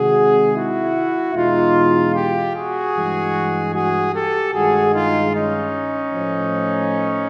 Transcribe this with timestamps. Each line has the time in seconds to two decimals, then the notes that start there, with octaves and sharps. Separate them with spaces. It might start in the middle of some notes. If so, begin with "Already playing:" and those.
Already playing: C3 D#3 G#3 F#4 G#4
0.55 E4 F#4
1.35 E2 B2 G#3 D#4 F4
2.15 F4 G4
2.54 F#4 G#4
2.94 G2 E3 G#3
3.74 F#4 G#4
4.14 G4 A4
4.53 G2 D#3 G#3 F#4 G#4
4.93 D#4 F4
5.34 C#4 D#4
6.13 A2 F3 A3